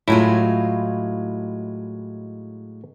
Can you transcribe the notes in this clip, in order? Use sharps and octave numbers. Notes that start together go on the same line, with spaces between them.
A2 F#3 G#3 E4 F4